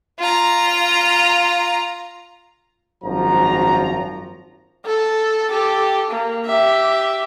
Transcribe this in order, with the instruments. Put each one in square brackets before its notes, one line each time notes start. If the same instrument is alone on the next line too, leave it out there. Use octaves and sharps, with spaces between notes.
[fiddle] F4 A#5
[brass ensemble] G#1 F#2 F3 F#4 A#5
[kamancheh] A4
G4 A4
A#3
G4 E5